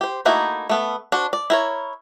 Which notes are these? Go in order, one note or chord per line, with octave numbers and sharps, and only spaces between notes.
G4 C5
A3 A#3 D#4 E4 F#4
A3 B3 A4
D4 F#4 C5
D5
E4 A#4 C#5